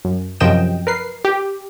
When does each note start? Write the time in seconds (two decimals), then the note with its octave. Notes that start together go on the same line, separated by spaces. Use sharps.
0.05 F#2
0.40 F#2 C3 F3 D#5 G5 E7
0.87 A#4 B4 C7
1.25 G4